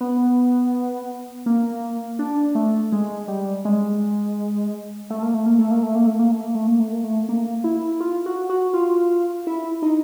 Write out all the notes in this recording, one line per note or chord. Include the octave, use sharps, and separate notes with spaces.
B3
A#3
D4
A3
G#3
G3
G#3
A3
A#3
A3
A#3
A3
A#3
A3
A#3
A3
A#3
A3
A#3
A3
A#3
A3
A#3
A3
A#3
E4
F4
F#4
F#4
F4
E4
D#4